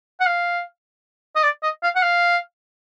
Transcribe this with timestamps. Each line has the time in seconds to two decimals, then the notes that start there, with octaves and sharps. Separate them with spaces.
0.20 F#5
0.26 F5
1.35 D#5
1.43 D5
1.63 D#5
1.83 F5
1.95 F#5
2.02 F5